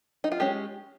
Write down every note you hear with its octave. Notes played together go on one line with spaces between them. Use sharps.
D#4
F4
G#3 C#4 G4